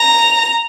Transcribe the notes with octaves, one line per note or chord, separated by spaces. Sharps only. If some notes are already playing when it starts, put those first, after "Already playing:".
Already playing: A#5